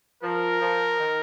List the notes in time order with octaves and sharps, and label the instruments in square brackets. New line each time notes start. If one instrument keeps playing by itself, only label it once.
[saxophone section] F3 [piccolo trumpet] A#4
[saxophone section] F3
D#3